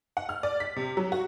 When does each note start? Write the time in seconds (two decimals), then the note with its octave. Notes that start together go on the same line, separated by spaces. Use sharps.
0.17 F#5
0.29 F6
0.43 D5
0.60 B6
0.76 C3
0.97 F#3
1.12 F#4